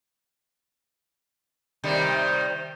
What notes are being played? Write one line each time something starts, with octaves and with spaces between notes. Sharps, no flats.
C3 D#3 G3